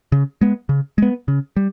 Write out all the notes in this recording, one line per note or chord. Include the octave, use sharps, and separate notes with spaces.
C#3
G#3 B3
C#3
G#3 B3
C#3
G3